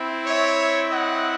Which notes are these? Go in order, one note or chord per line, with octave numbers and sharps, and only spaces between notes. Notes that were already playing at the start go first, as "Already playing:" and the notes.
Already playing: C4 E4
C#5 E5
D#5 F#5